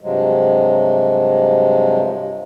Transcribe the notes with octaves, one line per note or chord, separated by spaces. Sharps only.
G2 C3 F3 F#3 G#3